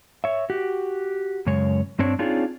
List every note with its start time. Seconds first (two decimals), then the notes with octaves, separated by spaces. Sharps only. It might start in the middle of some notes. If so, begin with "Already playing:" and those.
0.24 C#5 E5
0.50 F#4 G4
1.46 F#2 C#3 G#3 C#5
1.99 G2 C4 D4 C#5
2.19 C4 D4 D#4 F4 G#4 C#5